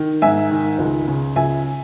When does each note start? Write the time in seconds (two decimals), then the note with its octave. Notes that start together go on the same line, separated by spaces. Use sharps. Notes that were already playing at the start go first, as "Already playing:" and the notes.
Already playing: D#3
0.22 G#2 E5 G#5
0.51 D#3
0.78 C#2
1.07 C#3
1.36 C#2 E5 G#5